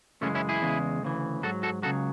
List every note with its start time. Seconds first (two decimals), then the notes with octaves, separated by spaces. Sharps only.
0.21 F#2 C#3 E3 G#3 A3 C#4
0.35 C#4 E4
0.49 E4 G#4
0.62 E2 C#3 G#3
1.02 D2 C#3 E3
1.43 G#2 F#3 F#4 A4
1.63 F#4 A4
1.83 C#2 C#3 F#3 F#4 A4